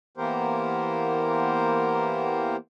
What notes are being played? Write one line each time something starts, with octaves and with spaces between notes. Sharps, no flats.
E3 A#3 B3 G4 A#4 C5